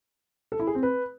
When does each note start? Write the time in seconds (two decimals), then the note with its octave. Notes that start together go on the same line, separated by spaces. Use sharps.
0.52 A4
0.60 E4
0.67 G#4
0.75 C4
0.83 B4